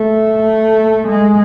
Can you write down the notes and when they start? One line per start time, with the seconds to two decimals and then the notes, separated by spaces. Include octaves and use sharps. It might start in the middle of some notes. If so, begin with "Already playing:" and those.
Already playing: A3
1.08 G#3